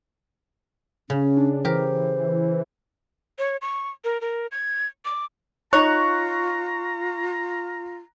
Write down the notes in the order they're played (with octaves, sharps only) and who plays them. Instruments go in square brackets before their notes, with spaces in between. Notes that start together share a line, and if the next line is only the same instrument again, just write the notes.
[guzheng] C#3 [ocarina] C#4
[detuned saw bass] D4
[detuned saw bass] E3 [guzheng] G4 A#4 [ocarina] C5
[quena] C#5
C#6
A#4
A#4
G#6
D6
[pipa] D#4 C#5 [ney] F4 [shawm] A#5 [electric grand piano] C#6 F#6